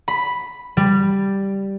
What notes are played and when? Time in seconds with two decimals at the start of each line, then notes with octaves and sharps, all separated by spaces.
0.08 B5
0.77 G3